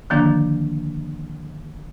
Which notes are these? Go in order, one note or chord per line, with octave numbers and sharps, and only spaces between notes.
D3 D#3 F3 A#3 D4